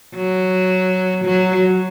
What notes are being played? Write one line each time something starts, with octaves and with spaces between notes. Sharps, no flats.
F#3
F#3